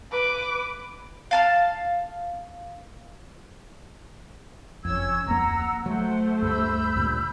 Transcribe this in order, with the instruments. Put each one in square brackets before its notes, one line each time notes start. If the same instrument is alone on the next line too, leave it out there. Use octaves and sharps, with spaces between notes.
[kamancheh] B4 D6
[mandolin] F5 A5 F6
[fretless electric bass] F#1 F2 [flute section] C#4 E6 G#6
[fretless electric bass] D1 F2 A#3 [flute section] F#5 A#5 E6
[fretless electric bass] F#3 [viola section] A3 C5 [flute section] F#5
[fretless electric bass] D2 G2 [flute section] B5 E6 G6
[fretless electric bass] D2 G2 A#2